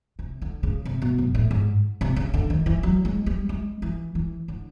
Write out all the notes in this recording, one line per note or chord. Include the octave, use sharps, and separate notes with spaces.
C3
D3
C#3
C3
B2
F#2
A2
G#2
C3
C#3
D3
D#3
E3
F#3
G#3
G3
G#3
E3
E3
D3